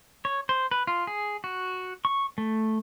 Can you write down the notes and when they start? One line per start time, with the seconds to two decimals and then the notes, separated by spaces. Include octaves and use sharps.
0.25 C#5
0.49 C5
0.71 B4
0.87 F4
1.07 G#4
1.44 F#4
2.05 C#6
2.38 A3